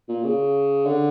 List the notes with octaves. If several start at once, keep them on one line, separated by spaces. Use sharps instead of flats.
A#2
C#3
D3